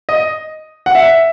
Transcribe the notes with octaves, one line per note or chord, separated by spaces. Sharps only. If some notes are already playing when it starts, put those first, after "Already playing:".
D#5
F#5
E5